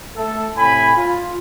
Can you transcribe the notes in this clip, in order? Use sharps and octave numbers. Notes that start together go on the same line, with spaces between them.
A3 A4
A2 C3 G#5 B5
F4